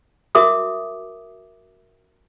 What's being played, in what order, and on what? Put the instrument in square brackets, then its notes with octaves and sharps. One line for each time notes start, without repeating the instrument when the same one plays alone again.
[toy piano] F#4 A#4 E5 D6 D#6